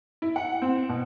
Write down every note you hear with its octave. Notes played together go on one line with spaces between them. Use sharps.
E4
F#5
C4
B2